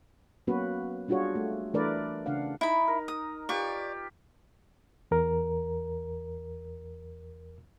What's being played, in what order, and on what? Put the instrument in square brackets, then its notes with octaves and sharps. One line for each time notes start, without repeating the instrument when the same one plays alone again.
[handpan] F#3 A#3 B3 C#4 F#4 B4
G3 D4 F4 F#4 G#4 C#5
A3
E3 A3 D4 A#4 B4 D5
C#3 D4 F5 F#5
[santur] D#4 [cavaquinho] E4 B5
[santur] A#4
[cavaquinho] D#6
[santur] F4 G4 B4 [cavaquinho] D5 C#6
[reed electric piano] E2 A#4